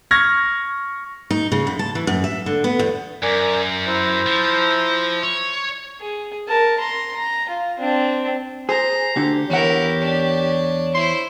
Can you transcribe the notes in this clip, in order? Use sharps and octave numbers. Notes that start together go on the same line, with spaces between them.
C#6 F6 G#6 A#6
D#4
C#3
F#2
A5
E3
F#2
E5
D3
B3
E2
F#2 A#4 D5 G#5
E4 C5 A#5
F3
C#5
G#4
A#4 A5
A#5 C6
A#5
F4
C4 D4
G#4 C5 A#5
D2 D3 G4
E2 E4 A#4 C#5 F#5
D4
E4 C5 C6